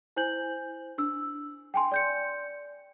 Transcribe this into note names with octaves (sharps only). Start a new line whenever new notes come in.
E4 C5 G#5 G6 F#7
D4 E6
G5 G#5 C6
D5 G6 C#7